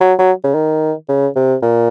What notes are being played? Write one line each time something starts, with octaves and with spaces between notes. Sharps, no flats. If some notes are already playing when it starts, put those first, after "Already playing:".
F#3
F#3
C#3
D#3
C#3
C3
A#2